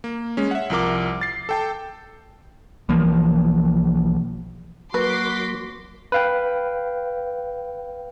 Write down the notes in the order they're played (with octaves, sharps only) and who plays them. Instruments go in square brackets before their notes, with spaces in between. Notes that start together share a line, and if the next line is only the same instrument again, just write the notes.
[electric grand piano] A#3
G#3 C#4
E5 F#5
C2 F3 A#4 D6
A6 C7
A4 G5 A5
[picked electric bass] B1 E3 F3 A#3
[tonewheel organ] F#3 A#3 [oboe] F#4 [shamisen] B4 [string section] C6 D6 B6
[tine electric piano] B4 F5 G5